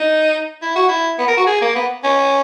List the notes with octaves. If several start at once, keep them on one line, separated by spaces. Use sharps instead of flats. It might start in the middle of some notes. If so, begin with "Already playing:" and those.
Already playing: D#4
E4
F#4
E4
B3
A#4
F#4
G#4
A#3
B3
C#4